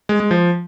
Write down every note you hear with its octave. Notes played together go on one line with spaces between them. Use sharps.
G#3
G#3
F3